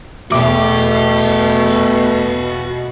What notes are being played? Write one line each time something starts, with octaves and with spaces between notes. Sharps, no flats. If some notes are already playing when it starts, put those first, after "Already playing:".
E2 B2 A3 F#4 E5 G5 D6